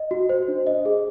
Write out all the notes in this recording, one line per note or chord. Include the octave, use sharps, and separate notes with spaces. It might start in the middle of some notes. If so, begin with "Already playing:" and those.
Already playing: D#5
F#4
C5
D4
D#5
G#4